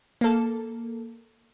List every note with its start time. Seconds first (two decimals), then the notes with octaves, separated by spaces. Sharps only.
0.21 A#3 A4